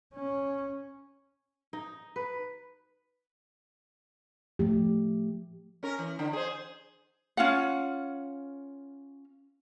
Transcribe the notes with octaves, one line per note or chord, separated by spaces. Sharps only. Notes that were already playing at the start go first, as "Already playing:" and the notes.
C#4
D#4
B4
F3 A3 G4
C#4 A#4
E3
D3
G#4 C5
C#4 F4 F5 F#5